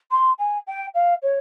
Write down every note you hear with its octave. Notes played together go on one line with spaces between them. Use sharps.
C6
G#5
G5
F5
C#5